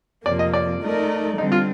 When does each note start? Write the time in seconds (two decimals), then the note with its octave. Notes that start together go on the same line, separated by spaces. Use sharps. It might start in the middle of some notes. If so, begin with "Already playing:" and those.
0.25 F2 C3 F3 A#3 D5
0.39 D#5
0.54 D5
0.82 A3 D#4 A#4 D5
1.37 D3 G3 C4 D#4
1.52 F4